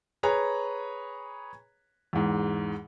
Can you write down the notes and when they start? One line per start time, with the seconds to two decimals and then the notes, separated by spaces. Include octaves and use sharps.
0.23 G#4 B4 C#5 A#5
2.13 E2 G#2